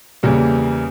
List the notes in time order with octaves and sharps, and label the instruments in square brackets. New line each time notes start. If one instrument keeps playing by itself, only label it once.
[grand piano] E2 C#3 G3 A#3